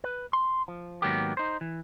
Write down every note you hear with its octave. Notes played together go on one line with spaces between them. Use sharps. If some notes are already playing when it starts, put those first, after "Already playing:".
B4
C6
F3
G#2 D#3 F#3 A#3 B3 G4
D#4 C5
E3